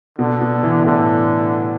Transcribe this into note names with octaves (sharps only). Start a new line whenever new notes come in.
B2 D3
B2
E3
A2 D3